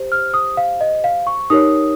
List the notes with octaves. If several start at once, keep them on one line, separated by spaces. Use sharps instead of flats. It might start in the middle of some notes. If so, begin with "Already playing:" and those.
Already playing: G4 C5
F6
D#6
F5
D#5
F5
C#6
D#4 G4 A#4 C#5 D#6